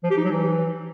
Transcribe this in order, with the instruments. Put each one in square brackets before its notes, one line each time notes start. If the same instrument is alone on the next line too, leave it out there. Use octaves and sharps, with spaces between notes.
[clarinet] F3
G4
D#4
F#3
E3